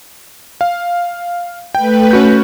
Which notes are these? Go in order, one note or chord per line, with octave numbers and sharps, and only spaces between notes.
F5
A3 B4 G5
C#4 F#4 G6